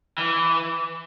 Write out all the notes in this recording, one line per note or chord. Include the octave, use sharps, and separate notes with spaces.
E3